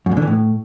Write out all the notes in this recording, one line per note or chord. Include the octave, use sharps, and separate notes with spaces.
F#2
A#2
D3
E3
A2